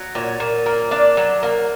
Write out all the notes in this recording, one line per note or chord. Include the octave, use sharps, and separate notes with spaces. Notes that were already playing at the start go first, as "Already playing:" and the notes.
Already playing: F#3
A#2 C#5
A#2
A#3
D4 D5
F#3
A#3